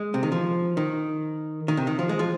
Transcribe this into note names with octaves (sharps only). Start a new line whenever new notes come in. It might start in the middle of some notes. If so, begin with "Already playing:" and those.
Already playing: G#3
C3
D#3
F3
D#3
D#3
C3
D#3
F3
G#3
F3